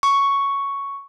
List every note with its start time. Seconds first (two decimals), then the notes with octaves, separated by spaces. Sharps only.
0.03 C#6